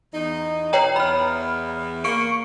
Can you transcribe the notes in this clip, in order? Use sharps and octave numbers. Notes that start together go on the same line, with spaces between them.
E2 D#4
B2 C#5 G5 A#5
E2 B5 F6
A#3 C#6 C#7 D7